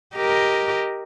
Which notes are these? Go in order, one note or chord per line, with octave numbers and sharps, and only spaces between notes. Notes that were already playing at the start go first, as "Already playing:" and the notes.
G4 A#4 D#5